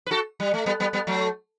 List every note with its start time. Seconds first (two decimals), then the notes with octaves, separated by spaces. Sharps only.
0.06 B4
0.11 F#4 A4
0.40 G3
0.54 A3
0.66 G3 B3
0.80 G3 B3
0.93 G3 B3
1.07 F#3 A3